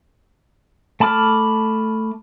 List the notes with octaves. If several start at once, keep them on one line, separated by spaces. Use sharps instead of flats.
A3 A5 B5 D6 F6